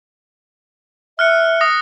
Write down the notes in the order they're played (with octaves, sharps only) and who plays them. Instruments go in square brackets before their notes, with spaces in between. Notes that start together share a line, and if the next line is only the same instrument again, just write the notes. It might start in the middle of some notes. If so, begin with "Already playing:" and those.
[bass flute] E5 [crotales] F6 F#6 C#7
[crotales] D#6 A#6